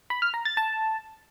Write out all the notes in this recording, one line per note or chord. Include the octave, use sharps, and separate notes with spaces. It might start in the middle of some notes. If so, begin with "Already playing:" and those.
B5
F6
A#5
A6
A5